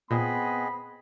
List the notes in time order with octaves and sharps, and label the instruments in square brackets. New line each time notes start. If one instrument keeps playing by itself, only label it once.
[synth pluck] A#2 [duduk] B3 [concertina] C4 G#4 D#5 [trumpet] B5